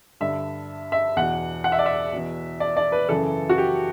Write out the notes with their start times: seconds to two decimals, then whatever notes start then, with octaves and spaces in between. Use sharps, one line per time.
0.20 G2 D3 E5
0.92 E5
1.17 E2 B2 F#5
1.64 F#5
1.72 E5
1.79 D5
1.86 E5
2.13 E2 B2
2.60 D5
2.77 D5
2.92 B4
3.08 F#2 C#3 E3 A4
3.49 F#4
3.58 G4